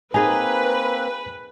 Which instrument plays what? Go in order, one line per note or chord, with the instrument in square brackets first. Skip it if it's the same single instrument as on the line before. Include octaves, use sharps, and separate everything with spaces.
[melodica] A#3 C4 [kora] D#4 G#4 [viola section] B4 [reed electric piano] G#5